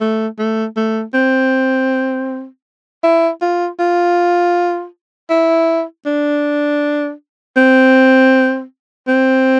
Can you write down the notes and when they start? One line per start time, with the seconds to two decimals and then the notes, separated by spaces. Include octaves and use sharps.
0.01 A3
0.39 A3
0.77 A3
1.14 C4
3.03 E4
3.41 F4
3.79 F4
5.30 E4
6.06 D4
7.57 C4
9.08 C4